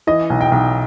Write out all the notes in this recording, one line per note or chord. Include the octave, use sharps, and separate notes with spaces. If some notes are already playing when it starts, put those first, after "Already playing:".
E3 D#5
B1
G5
B1